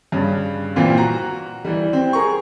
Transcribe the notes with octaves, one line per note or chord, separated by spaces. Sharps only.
G2 C#3
A#2 E3 A#3 C4 F4
F#4 A#5
E3 G3
C4
G#4 A#4 C#6